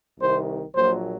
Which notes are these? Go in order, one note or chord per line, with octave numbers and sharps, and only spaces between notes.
C2 C3 D#3 C5
A#1 A#2 F#3 C5